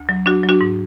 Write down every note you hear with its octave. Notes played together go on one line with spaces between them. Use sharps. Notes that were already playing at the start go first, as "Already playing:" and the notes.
Already playing: D2
F#3
F#3 D4 F#4
F#3
D4 F#4
G#2